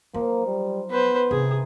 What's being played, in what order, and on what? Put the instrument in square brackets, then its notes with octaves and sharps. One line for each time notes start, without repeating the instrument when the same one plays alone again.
[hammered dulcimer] F3 D#4 [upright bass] F#3 [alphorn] A#3
[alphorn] G3
[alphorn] B3 [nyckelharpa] B4 C5
[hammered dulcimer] G2 D#3 E3 [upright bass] C3 [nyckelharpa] G#4